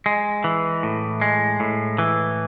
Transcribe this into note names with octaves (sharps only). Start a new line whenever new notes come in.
G#3
E3
A2
G#3
A2
E3